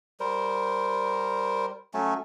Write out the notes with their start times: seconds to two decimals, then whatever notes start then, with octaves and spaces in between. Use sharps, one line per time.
0.20 G3 A#4 C5
1.94 F#3 A3 C#4